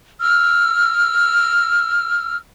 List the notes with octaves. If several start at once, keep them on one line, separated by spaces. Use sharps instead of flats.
E6 F6